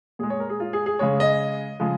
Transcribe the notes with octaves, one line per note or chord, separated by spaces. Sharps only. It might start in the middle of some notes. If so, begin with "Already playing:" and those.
A#2 G#3 G#4
C#5
A#4
G#4
F4
G#4
G#4
C#3 G#3 C#5
D#5
C#3 F3 G#3